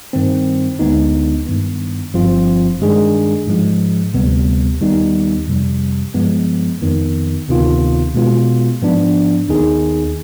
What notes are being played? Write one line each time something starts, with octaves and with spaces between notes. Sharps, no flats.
G2 D#3 G3 C4
D2 D3 G#3 B3 D#4
G2 D#3 B3
G1 G2 F3 C4 F4
G2 D#3 G#3 D4 G#4
G#2 F3 G#3
D2 C3 G3 B3
D#2 D#3 G3 B3 D#4
F2 C3 G3
G2 F3 G#3 B3
F2 D#3 B3
D2 C3 D#3 B3 F4
B2 G#3 B3 F4
G#2 F3 B3 D4
D#2 D#3 B3 D#4 G#4